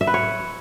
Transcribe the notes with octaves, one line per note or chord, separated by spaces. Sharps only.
E5
B4
C#5